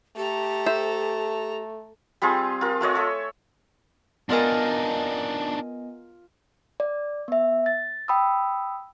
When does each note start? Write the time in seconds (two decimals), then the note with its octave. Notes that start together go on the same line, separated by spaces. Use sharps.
0.17 A3 G4 A4 A#5
0.66 C5 E5
2.22 G3 C4 F4 G#4
2.61 F4 A#4
2.81 A3 F4 C#5 D#5
2.95 A4 E5
4.30 B3 D4 D#4 F4 A#4 D#5 G#5
6.80 D5
7.28 B3 E5
7.66 A6
8.08 G5 B5 D#6 E6